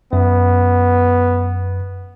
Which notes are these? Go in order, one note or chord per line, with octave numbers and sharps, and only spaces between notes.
F#2 B3